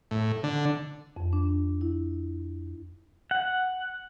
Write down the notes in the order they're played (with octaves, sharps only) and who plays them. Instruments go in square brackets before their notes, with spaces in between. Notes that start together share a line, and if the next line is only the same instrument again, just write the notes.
[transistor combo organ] A2
D3
[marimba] F2
D4
E4
[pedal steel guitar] F#5